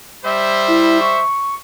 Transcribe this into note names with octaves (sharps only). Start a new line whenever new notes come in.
G3 C5 E5
E4
C#6